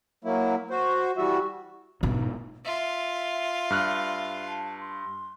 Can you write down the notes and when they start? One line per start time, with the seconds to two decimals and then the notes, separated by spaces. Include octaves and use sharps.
0.24 F#3 A#3 E4
0.70 F#4 C5
1.17 E3 G3 F#4 E5
2.03 G#2 B2 B3 D#4
2.65 F4 E5
3.70 G2 F6 F#6
4.48 A5
4.81 C6